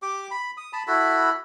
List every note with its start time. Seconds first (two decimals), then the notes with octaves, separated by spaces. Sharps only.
0.02 G4 D6
0.31 B5
0.57 D#6
0.73 A5 B5
0.87 E4 F#4 A4 B5